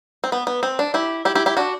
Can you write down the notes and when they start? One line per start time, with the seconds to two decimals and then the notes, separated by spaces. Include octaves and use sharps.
0.24 C4
0.32 B3
0.47 B3
0.63 C4
0.79 D4
0.94 E4 G4
1.25 E4 G4
1.35 E4 G4
1.46 E4 G4
1.57 D4 F#4